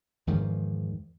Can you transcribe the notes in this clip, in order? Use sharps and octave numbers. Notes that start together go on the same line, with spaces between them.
E2 G#2 D#3 F3